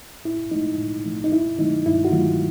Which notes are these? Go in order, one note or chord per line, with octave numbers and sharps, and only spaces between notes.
A2 E4
F3 A3 D#4
A2
F3 A3
D#4
G2 E4
D#3 F#3 A3 D#4
G2 E4
F#4
D#3 F#3 A3 F4